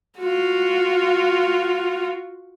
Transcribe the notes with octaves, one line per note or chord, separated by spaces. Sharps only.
F4 F#4